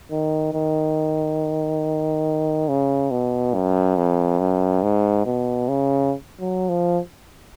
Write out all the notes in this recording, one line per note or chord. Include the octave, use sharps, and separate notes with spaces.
D#3
D#3
C#3
B2
F#2
F2
F#2
G#2
B2
C#3
F#3
F3